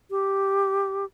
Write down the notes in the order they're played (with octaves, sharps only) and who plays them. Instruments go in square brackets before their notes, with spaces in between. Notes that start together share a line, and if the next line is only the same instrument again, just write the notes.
[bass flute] G4